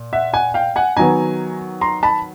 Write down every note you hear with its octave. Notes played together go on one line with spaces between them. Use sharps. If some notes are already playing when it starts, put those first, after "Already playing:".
Already playing: A#2
E5 F#5
F#5 G#5
F5 G5
F#5 G#5
D#3 F#3 B3 G#5 A#5
A#5 C6
A5 B5